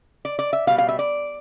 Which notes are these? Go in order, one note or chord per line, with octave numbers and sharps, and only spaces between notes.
D5
D5
E5
B2 G3 F5
F5
E5
D5